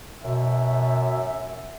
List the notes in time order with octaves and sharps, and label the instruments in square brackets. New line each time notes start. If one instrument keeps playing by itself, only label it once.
[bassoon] F#2 [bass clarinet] B2 [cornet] E5